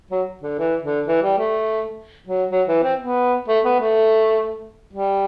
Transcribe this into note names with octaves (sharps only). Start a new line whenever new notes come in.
F#3
D3
E3
D3
E3
G3
A3
F#3
F#3
E3
C4
B3
A3
B3
A3
G3